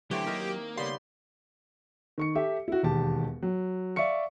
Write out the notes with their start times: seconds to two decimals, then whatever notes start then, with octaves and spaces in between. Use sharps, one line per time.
0.11 D3 E3 F#3 A3 C4 G4 C#5
0.27 D#3 A#3 A#4
0.77 C#3 G3 B3 G4 F5 C6
2.18 D#3 C#6 C#7
2.35 G4 A4 E5
2.68 E4 F#4
2.83 E1 D#2 G4 A5
3.43 F#3
3.96 D5 E5 F5 C#6 C#7